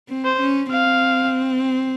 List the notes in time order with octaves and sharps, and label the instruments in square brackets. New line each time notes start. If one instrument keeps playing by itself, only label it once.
[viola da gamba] C4
[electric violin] C5
[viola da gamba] C#4
[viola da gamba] C4 [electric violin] F5